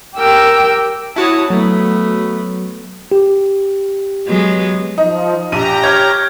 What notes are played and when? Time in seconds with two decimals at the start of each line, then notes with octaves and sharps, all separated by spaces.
0.16 G4 A#4 G5 E6
1.16 E4 F#4 C#5 A5 D#6
1.50 F#3 A3 B3
3.12 G4
4.27 F#3 G#3 B3
4.98 F3 D#4
5.52 A#1 G4 A#5 D#7
5.84 C#5 F6 G6 G#6